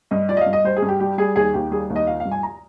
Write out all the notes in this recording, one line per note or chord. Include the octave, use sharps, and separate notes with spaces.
G2 D#5
F3 D5
D#5
F5
G2
D#5
G3 C5
G#4
G2
G4
G3 G4
G3 G#4
D#2 G#4
D#2 G4
G3 G#4
D#2
D#5
F3 F5
F5
G2
G#5
A#5